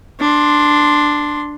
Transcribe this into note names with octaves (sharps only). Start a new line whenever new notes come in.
D4 C6